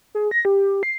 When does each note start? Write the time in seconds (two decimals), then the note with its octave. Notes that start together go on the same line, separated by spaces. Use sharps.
0.15 G#4
0.31 A#6
0.45 G4
0.83 C7